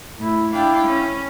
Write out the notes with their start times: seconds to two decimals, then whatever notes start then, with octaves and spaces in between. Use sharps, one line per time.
0.20 A2 E4
0.53 D4 E4 F5 G5
0.87 C#4